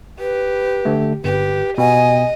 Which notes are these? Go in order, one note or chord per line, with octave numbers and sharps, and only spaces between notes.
G4 B4
D3 A3
G1 G4 B4
B2 B3 D#5 G#5